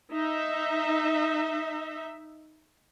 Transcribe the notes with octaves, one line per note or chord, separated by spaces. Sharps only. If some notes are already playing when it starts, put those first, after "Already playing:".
D#4 E5